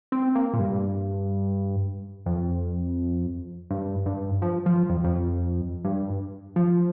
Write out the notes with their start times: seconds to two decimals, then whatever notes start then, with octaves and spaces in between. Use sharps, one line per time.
0.12 C4
0.35 A#3
0.53 A#2
0.59 G2
2.26 F2
3.70 G2
4.06 G2
4.42 F3
4.66 F3
4.89 F2
5.04 F2
5.84 G2
6.56 F3